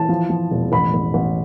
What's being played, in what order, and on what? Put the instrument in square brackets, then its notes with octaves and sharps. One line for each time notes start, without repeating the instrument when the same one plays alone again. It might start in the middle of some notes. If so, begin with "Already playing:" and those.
Already playing: [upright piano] E3 A5
F3
F3
E1
A1 B5
A1
A1